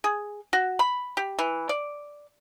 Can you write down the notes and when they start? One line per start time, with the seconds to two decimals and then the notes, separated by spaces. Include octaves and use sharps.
0.04 G#4
0.53 F#4
0.79 B5
1.17 G4
1.39 E3
1.69 D5